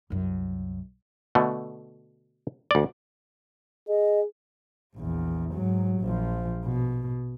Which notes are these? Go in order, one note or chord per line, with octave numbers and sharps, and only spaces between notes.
C2 F#2
B2 D3 A3
D2 D5
G#4 D#5
A#1 E2
G#2 F#3
A#1 F3
B2